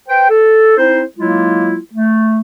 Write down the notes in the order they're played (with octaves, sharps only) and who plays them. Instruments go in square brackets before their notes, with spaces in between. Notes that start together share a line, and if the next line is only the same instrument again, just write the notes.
[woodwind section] B4 C5 G5
A4
C4 D#4 E4 C5
F#3 G#3 A#3 E4 F4
A3